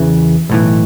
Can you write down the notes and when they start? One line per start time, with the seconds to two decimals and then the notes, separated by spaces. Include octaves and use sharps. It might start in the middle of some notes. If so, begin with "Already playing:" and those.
Already playing: E2 C#3 E3
0.50 B1 A2 E3